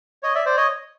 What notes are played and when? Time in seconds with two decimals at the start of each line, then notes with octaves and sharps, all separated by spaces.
0.23 C#5 D#5
0.35 D5 E5
0.46 C5 D5
0.56 C#5 D#5